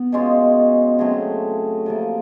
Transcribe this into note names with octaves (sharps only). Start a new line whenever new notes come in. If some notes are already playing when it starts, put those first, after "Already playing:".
Already playing: B3
B2 G#3 C#4 F4
C#3 F#3 A3 C4
C3 F3 A#3